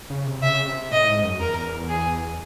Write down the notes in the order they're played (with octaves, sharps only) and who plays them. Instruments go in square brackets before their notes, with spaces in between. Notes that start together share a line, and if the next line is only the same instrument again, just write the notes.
[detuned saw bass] C#3
C3
[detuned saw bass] C#3 [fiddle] E5
[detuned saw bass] C3
[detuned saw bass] A2 [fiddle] D#5
[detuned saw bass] G#2
F#2
[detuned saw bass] E2 [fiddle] A#4
[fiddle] G#4